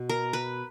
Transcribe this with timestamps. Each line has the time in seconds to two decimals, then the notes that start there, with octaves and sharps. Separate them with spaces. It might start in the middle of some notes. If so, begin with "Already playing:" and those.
Already playing: B2
0.09 A#4
0.33 B4